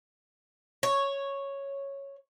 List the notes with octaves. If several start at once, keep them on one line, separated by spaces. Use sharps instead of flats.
C#5